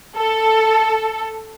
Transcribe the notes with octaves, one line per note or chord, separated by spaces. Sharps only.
A4